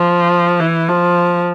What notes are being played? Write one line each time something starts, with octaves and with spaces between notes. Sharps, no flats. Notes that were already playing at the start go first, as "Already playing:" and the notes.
Already playing: F3
E3
F3